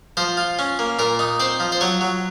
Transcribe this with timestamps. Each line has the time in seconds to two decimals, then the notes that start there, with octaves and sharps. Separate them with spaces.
0.17 F3 C5
0.37 F4
0.59 C#4
0.79 A#3
0.99 A#2 A#4
1.19 D#4
1.40 C4 C5
1.60 F3
1.72 C5
1.81 F#3 C#5
2.01 F#3